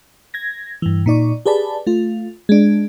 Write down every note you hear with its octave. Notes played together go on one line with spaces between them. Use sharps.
G#6 A#6
G2 E3
A#2 D#4 D5 C#6
G4 G#4 B4 D5 A5 B5
A3 F4
G#3 D4